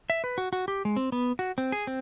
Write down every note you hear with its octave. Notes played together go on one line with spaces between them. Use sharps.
E5
B4
F#4
F#4
G4
G#3
C4
B3
F#4
C4
G#4
C4